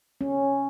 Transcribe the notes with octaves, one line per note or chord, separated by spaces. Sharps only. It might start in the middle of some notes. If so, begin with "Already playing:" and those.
C#4